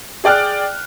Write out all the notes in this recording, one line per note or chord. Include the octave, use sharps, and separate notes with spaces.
G#4 D5 G5 F6 F#6